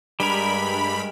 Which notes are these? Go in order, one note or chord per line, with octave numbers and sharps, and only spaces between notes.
G2 G3 G#3 A#4 B5